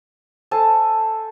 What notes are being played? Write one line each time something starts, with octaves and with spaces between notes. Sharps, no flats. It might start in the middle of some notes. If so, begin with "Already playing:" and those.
A4 C5 G#5 A5